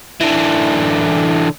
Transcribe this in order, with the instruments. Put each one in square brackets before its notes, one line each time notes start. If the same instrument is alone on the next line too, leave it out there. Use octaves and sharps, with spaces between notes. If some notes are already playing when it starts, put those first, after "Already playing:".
[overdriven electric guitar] D3 E3